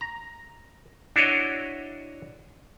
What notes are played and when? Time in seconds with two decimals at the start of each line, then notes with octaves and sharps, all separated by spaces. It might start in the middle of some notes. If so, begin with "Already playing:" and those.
0.01 A#5
1.16 D4 E4 F#4 C#5 D#5